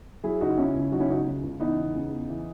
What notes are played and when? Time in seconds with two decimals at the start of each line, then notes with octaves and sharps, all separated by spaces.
0.23 F#3 E4 G#4
0.41 C#2 D#4 F#4
0.57 C#3 C#4 E4
0.75 C#2
0.92 F#3 D#4 F#4
1.00 C#4 E4
1.08 C#2 D#4 F#4
1.26 C#3
1.43 C#2
1.60 E3 B3 D#4
1.77 E2
1.95 C#3
2.11 E2
2.29 E3